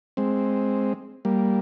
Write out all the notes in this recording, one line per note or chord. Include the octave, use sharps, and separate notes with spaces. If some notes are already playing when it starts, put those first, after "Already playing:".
G#3 C4
G3 A#3